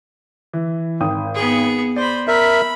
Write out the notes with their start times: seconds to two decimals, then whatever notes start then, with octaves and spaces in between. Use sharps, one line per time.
0.53 E3
1.01 G#1 G5 D#6
1.35 B3 G#4
1.96 C5 D5 B5
2.28 A#4 E5 B5